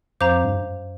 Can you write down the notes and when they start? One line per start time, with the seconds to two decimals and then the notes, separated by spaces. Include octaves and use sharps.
0.21 F2 C5 F5 A#5 D6 G6
0.44 G2
0.52 F#2